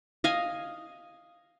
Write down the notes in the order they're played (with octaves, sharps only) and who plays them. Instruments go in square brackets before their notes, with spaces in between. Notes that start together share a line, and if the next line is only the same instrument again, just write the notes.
[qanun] D#5 F5 G#5